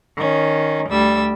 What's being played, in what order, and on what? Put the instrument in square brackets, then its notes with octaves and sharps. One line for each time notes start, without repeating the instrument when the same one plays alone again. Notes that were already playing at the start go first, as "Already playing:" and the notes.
[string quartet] D#3 C#4
D2 G3 E6